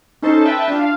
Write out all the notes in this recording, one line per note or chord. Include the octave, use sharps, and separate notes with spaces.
C#4 D#4 A4 C5 A5
B4 E5 G5 A5
D4 F4
F5